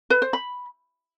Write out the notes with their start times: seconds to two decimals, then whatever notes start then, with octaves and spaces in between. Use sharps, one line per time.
0.10 B4
0.22 C5
0.33 B5